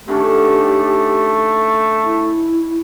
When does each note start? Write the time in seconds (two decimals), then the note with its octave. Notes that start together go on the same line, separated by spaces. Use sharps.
0.08 D3 D#3 A3 C#4 G4
2.05 E4